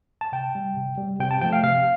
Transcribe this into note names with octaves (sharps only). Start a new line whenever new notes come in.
A5
C3 G5
G3
C3
G3
C3 G5
A5
F3 A3 G5
F5
C3 F5